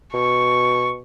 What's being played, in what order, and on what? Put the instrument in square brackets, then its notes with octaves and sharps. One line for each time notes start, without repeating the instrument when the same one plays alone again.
[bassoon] B2 [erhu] C#6